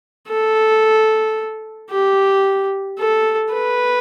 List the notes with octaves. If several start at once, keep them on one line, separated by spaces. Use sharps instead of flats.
A4
G4
A4
B4